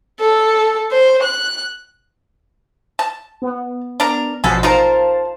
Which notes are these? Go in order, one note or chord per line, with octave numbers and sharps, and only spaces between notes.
A4
C5
F#6
A5
B3
D4 A#4
A1 B2 F3 G#3 B3 A4
D#4 F4 A#4 C5 F5 A5